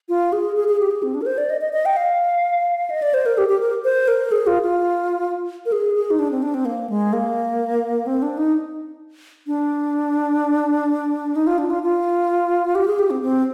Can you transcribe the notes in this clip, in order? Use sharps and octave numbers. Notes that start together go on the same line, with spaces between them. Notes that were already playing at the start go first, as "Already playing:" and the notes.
F4
G#4
G#4
G#4
G4
G#4
C4
D4
A#4
C5
D5
D#5
D#5
D#5
G5
F5
D#5
D5
C5
A#4
G4
G4
A#4
C5
A#4
G#4
F4
F4
A#4
G#4
G#4
D#4
D4
C4
D4
C4
A#3
G#3
A#3
C4
D4
D#4
D4
D#4
F4
D4
F4
F4
G4
G#4
G4
C4
C4